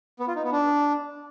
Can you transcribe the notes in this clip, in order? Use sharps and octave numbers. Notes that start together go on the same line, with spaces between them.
B3
F4
D#4
B3
D4